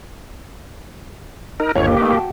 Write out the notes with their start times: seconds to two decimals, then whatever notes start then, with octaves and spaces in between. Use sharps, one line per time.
1.60 D#4 A#4
1.75 G1 D#2 C#5
1.87 A#3 G4
2.00 A3 D#4 B4
2.15 F#4 G5 A5